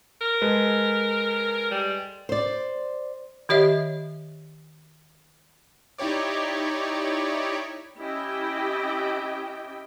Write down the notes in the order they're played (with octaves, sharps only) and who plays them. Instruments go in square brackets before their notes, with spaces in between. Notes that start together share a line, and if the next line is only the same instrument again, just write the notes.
[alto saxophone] A#4
[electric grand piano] G#3 A4 B4
[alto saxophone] G3
[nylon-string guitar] C5 D5
[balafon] D#3 G4 C#5 D#5 E5
[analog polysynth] D#4 E4 G4 C#5 D5
[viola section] C#4 E4 G4 D#5 G5